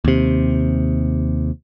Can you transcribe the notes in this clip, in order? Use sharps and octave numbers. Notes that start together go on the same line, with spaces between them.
D#2 C3